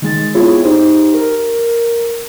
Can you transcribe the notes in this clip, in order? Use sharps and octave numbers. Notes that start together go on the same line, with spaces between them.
D#3 G#3 A6
B3 C4 E4 F4 G#4 C#5
D#4 G4 C5
A#4